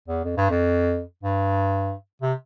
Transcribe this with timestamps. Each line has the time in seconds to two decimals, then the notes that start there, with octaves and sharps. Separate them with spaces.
0.08 E2
0.25 F2
0.37 G2
0.50 F2
1.23 G2
2.22 C3